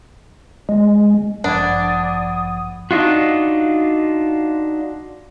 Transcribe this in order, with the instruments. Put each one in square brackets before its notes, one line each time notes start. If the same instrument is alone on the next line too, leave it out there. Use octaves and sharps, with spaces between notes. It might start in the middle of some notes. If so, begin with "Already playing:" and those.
[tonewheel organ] G#3
[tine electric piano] A1 G2 F3 [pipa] D4 [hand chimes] F#5 B5 G#6 [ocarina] D#6
[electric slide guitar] D4 D#4 F4 F#4